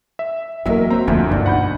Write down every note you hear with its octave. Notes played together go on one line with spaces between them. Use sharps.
E5
E2 F#3 G#3 A#3 A#4 D#5 E5
F#3 C4 A#5
F#1 D2 E3 F3 E5
B1 G2 D4 D#4
F#5 B5 G6